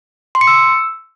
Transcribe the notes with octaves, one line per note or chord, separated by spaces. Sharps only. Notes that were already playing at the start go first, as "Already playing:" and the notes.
C6
C#7
E6